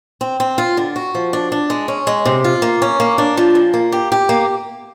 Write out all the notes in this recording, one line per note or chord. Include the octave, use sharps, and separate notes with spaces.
C4
C4
F4
D3
F#4
F3
D4
D4
G#3
C#4
G#3
C3
F4
A#3
C#4
A#3
D4
F3
A#2
A#3
G4
G4
A#3